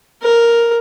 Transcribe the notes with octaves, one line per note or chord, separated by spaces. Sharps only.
A#4